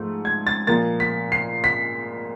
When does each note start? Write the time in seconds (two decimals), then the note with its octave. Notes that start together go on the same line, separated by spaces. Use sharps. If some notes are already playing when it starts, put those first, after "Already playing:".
Already playing: G#2 F3 A3
0.25 G#6
0.47 A6
0.67 A#2 F3 A#3 A6
1.00 B6
1.32 C7
1.64 B6